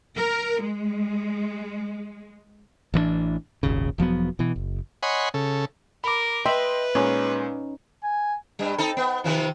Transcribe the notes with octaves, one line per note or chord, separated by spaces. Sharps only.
A#4
G#3
A1 E3 A3 D4
D#1 G#1 D#2 C#3
E1 F3 F#3 B3
B2 E3
F#1
C#5 D#5 F#5 G#5 B5 C6
C#3 A4
A#4 B5 D6
B4 D#5 E5 G5 C6
A#2 G#3 C#4 D#4
G#5
G2 G3
C4 D#4 A4
B3
C3 D#3 F3